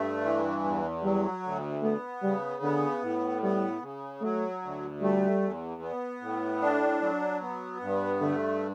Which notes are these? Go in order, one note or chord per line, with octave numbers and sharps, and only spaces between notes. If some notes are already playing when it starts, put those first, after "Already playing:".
Already playing: G2 A3
E3
E2
F#3 G3
D2
A3 B3
C#3 G3
D3 B3
A2
G3 B3
C#3
F#3 A3
D2
G3 A3
E2
B3
A2
D4
F#3
B3
G2
D3 A3